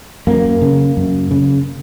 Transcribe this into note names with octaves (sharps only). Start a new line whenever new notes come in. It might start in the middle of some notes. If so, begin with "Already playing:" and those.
F#2 A#3
C#3
F#2
C#3